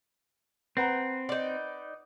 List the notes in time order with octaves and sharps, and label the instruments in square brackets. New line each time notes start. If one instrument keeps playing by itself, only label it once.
[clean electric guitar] C4 [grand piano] B4 F#5 A#5
[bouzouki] D#4 D5